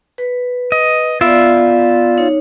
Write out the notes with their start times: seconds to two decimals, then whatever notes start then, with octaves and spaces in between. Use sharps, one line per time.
0.18 B4
0.72 D#5
1.21 B3 F4 D5 E5
2.18 D#4 C#5